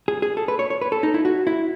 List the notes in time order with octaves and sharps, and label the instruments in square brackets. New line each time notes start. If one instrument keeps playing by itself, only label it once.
[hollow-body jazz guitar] G#4
G#4
A4
B4
C#5
C#5
B4
A4
D#4
E4
F#4
E4